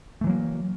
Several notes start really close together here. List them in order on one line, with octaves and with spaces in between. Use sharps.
A3 E3 F#3 A#3